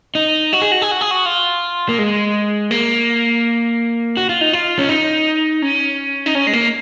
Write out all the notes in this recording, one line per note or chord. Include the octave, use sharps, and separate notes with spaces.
D#4
F#4
G#4
F#4
G#4
F#4
G#4
F#4
F4
A#3
G#3
A#3
F#4
F4
D#4
F4
C#4
D#4
C#4
D#4
C#4
G#3
A#3